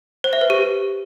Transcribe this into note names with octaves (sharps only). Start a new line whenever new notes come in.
C5
E5
B4
G4